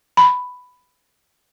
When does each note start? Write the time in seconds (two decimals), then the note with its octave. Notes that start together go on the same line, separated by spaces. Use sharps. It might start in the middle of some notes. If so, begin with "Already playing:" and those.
0.17 B5